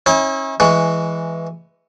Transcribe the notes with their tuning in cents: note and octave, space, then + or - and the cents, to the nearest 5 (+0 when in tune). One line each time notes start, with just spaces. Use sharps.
C#4 -30 E4 -45
E3 +5 G#3 +0 C#6 +15